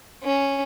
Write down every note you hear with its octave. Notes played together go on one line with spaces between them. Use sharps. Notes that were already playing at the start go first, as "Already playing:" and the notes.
C#4